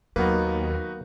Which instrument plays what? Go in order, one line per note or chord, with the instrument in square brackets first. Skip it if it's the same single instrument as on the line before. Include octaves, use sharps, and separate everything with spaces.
[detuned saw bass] D#2 [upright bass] F#3 [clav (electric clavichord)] A#3 B3 [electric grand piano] D#4 F#4 B4